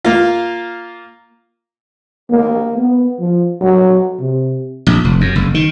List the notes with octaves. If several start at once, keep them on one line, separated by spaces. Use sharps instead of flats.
A#3 F4
A#3
B3
F3
F#3
C3
A#1
F1
F#2
F#1
D#3